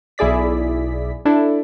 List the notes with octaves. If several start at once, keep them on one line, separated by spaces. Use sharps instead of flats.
B1 E4 G#4 D5 B6
D4 E4 A4